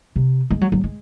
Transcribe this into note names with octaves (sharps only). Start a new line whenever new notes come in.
C3
G#3
F#3
F#3
G#3